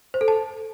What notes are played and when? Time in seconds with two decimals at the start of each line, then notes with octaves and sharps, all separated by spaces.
0.14 C5
0.21 A4
0.28 A5